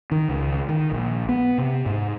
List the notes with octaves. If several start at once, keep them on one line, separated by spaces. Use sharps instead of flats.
D#3
C#2
D#3
A#1
B3
C3
G#2